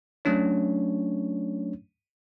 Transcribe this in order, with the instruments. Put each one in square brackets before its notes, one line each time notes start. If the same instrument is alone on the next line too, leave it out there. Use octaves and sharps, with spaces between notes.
[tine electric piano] F#3 A3 C#4 D4 C#5